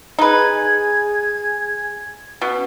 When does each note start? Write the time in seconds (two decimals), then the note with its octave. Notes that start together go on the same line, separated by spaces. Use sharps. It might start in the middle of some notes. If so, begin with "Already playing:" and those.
0.19 D#4 G#4 B4 G#5 G#6
2.41 B2 C#4